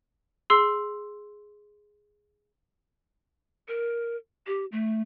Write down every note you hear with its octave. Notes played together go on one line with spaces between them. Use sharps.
G#4 C6 E6 C7
A#4
G4
A3